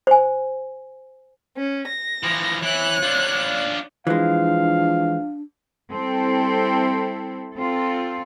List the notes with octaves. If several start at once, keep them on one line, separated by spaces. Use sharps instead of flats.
C5 G#5
C#4
A#6
E3 F3
E3 C#5 F#6
D4 F4
E3 F3 G#3 D4 F5
G3 C4 E4 A4
C4 F4 A4